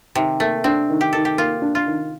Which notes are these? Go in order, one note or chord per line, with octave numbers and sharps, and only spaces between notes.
C3 D#3
A3 A#3
C4 D4
D#3
G4
D#3 A4
G4
A#3 F4
D4
F4
D#3